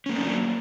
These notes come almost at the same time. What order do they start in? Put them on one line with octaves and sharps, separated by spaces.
C#4 A#3 A3 D4 F#3